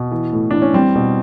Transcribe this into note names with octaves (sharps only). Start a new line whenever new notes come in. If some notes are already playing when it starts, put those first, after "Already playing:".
Already playing: B2
E3
A2
E3 D4
C#4
G3 C4
B2